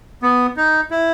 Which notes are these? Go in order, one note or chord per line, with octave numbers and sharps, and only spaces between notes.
B3
D#4
E4